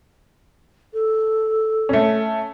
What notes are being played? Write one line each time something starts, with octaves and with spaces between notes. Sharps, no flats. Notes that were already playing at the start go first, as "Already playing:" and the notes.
A4
A3 C#4